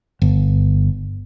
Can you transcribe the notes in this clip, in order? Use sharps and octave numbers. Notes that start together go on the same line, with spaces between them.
G1